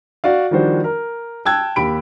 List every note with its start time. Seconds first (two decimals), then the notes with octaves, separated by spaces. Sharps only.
0.24 F#4 D5 F5
0.51 D#3 F3 G3 D4 F#4 C5
0.84 A#4
1.45 G5 A5 E6 F#6 G#6
1.76 D#2 G4 B5 D7